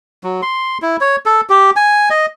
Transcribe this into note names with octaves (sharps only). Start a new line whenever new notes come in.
F#3
C6
E4
C#5
A4
G4
G#5
D#5